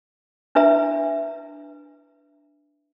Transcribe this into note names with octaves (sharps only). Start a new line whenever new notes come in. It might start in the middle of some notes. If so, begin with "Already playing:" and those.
D4 E4 B4 E5 A#5